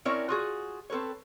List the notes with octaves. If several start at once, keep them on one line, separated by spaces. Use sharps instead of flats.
C4 C#4 E4 A#4 C#5 D5
F4 F#4 G#4
C4 A4 B4 C#5